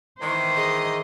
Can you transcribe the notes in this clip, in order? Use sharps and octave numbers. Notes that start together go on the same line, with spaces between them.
D#3 E3 C5
G#4 D#5